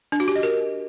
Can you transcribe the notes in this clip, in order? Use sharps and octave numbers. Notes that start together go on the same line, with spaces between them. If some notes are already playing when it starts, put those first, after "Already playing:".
D4
F#4
G4
D#5
A#4